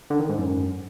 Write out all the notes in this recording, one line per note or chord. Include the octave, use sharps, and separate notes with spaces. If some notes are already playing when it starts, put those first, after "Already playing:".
D3
D#3
G#2
F#2